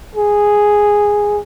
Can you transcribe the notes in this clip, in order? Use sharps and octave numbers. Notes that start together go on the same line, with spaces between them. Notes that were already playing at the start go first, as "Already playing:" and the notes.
G#4